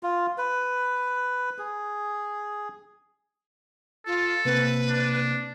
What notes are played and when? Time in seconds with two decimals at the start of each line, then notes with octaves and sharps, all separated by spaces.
0.03 F4
0.38 B4
1.58 G#4
4.07 F4 A4
4.45 C3 A#3 C4 B4
4.88 D4